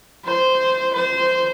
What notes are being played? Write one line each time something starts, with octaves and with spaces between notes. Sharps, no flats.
C5
C5